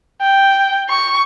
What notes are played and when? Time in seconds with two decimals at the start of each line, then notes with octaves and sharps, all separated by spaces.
0.22 G5
0.90 C#6